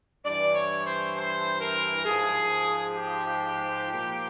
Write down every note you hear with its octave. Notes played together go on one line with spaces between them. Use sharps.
G2 E3 D5
C#5
C5
C5
A#4
G#2 F3 G#4
G4
A#2 F3